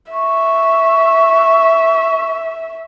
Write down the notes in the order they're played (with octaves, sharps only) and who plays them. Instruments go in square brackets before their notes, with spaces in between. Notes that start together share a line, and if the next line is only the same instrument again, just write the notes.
[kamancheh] E5 [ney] C#6